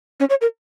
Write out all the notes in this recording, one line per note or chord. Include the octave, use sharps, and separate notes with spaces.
C#4
C#5
A#4